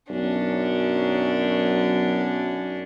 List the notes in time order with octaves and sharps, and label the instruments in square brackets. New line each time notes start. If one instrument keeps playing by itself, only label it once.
[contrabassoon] B1 [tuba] F#2 [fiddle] C#4 D4